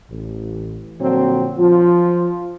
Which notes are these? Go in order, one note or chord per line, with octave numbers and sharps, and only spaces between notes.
A1
A#2 D3 F3 F#3 C4
F3 F4